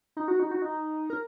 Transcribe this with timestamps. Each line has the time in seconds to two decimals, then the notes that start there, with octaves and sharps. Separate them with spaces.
0.17 D#4
0.28 F#4
0.39 D#4
0.51 F#4
0.62 D#4
1.10 A#4